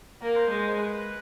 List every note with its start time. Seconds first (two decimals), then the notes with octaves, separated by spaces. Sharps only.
0.22 A#3 A#4
0.36 C5
0.50 G#3
0.68 C5
0.78 B4